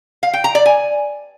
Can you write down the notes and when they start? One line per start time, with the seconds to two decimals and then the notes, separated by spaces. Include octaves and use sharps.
0.23 F5
0.33 G5
0.44 A#5
0.55 D5
0.66 G#5